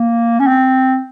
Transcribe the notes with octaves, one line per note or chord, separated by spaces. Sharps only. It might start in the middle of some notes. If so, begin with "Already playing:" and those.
Already playing: A#3
C#4
C4